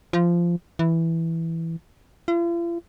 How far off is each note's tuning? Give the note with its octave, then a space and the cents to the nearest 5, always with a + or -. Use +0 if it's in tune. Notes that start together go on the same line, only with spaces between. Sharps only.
F3 -15
E3 +0
F4 -45